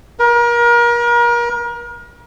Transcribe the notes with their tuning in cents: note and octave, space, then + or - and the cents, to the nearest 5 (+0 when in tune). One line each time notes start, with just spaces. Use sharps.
A#4 +35